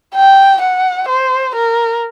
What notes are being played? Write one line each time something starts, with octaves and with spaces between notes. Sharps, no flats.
G5
F#5
C5
A#4